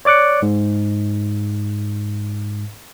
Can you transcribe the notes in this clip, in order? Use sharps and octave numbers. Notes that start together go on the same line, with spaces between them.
C#5 D5 D6 F#6 C#7
G#2